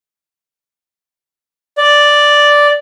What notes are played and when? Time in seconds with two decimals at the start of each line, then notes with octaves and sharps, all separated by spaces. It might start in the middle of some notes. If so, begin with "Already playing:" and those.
1.78 D5